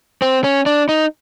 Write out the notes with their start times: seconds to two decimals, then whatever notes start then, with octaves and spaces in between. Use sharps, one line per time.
0.22 C4
0.44 C#4
0.66 D4
0.89 D#4